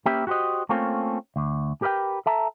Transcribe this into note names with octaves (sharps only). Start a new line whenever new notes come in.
A#3 C#4 G4 B4 E5
F#4 G4 B4 C5 D#5
A3 A#3 C4 C#4 F4 A4
D2
G4 A#4 B4 E5 G5
A4 E5 A5 A#5